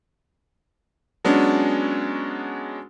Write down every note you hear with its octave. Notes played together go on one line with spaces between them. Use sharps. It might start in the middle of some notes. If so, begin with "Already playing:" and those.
F#3 G#3 B3 C#4 D4